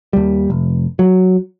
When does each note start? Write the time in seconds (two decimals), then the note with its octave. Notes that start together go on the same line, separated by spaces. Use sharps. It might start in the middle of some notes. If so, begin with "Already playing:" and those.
0.13 D#2 G3
0.50 F1
0.99 F#3